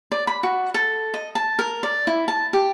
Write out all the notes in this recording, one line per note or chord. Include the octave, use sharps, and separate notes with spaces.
D5
B5
F#4
A4
D#5
A5
A#4
D5
E4
A5
G4